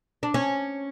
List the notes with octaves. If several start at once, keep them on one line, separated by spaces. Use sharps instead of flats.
D4
C#4